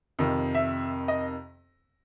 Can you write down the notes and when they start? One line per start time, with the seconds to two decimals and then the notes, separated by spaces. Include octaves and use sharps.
0.19 F2 C3 D#3
0.55 E5
1.08 D#5